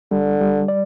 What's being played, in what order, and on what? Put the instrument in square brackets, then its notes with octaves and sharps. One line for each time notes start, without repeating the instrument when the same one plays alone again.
[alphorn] D3 [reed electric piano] G3
[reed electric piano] G3
D5